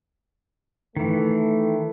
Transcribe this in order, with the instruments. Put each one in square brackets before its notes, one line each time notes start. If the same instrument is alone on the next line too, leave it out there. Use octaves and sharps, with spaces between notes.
[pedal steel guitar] D#3 E3 [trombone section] A3